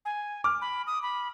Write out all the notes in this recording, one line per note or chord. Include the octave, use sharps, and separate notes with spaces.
G#5
D6 F6
B5
D#6
B5